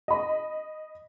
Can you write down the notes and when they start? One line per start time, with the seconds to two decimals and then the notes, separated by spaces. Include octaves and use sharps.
0.08 D#5 B5